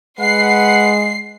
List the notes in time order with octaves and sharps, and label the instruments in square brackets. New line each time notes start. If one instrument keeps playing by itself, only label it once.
[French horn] G#3 [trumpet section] B4 F#5 [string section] C7